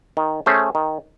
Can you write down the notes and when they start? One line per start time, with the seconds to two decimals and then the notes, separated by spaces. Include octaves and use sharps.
0.17 D#3
0.46 A3 C#4 G#4 C5
0.75 D#3